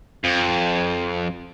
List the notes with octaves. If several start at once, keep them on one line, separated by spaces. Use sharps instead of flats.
F2